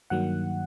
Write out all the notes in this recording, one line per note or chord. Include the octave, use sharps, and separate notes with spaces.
G2 D#3 F#3 A#3 F#5